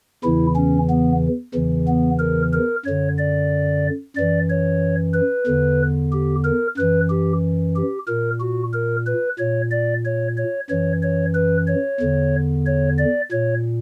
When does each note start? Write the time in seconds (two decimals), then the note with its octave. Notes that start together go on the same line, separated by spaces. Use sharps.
0.24 E2 C#3 E3 E4
0.56 C#4
0.89 B3
1.54 E2 C#3 E3
1.87 B3
2.19 A#4
2.53 A#4
2.85 F#2 D3 C#5
3.18 D5
4.16 F#2 E3 D5
4.49 C#5
5.14 B4
5.47 E2 D3
6.12 G4
6.45 A#4
6.77 F#2 E3 B4
7.09 G4
7.75 G4
8.08 A#2 A#4
8.40 F#4
8.74 A#4
9.07 B4
9.38 A#2 C#5
9.71 D5
10.05 C#5
10.37 C#5
10.69 F#2 E3 C#5
11.02 C#5
11.35 B4
11.67 C#5
12.00 E2 D3
12.66 C#5
12.98 D5
13.31 A#2 C#5